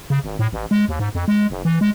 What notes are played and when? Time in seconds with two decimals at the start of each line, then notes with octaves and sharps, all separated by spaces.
0.10 C#3
0.24 G#1
0.39 A2
0.52 A1
0.71 G#3
0.88 D#2
1.00 G#2
1.15 F2
1.28 G#3
1.50 F#1
1.65 E3
1.81 G#3